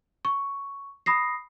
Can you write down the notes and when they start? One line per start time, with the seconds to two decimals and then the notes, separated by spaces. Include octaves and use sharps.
0.25 C#6
1.06 B5 D#6 A#6 C7